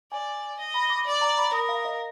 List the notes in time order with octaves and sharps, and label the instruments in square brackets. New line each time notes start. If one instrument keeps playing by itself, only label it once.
[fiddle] D5 [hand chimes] G#5
[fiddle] D#5
[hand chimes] B5
D6
[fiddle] D5 [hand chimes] D6
[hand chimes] A#5
B5
[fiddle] A#4 [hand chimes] D#6
[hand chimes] F5
D#5